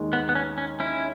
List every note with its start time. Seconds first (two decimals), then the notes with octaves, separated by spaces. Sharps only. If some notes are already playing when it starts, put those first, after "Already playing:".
Already playing: D#2 D#3 G#3
0.13 B3
0.29 B3
0.35 C#4
0.58 C#4
0.80 C#4 E4